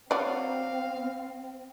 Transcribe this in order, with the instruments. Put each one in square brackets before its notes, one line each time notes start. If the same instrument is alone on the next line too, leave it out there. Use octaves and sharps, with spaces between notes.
[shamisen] F#3 D5 [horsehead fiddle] C4 [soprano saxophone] F5